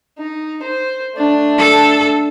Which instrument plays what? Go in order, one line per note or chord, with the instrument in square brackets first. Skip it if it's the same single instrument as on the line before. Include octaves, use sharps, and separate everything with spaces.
[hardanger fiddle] D#4
C5
A3 D4
[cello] A4